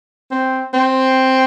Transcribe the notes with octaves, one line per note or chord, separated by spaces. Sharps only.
C4
C4